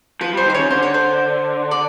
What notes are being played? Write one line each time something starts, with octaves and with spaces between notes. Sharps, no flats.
F3 B4
G3 C5
D#3 C5
C#3 C#5
D3 C5
C#5
C5
D5